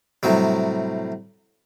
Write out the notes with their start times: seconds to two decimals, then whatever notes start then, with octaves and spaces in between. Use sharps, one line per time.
0.23 A2 C3 F#3 G3